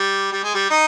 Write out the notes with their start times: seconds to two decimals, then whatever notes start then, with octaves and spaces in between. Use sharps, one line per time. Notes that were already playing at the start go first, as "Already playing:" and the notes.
Already playing: G3
0.32 G3
0.43 G#3
0.54 G3
0.70 D#4